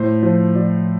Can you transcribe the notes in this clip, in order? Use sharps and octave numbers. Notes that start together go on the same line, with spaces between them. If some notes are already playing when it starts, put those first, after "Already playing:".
Already playing: A2 C5
F3 C5
F3 D5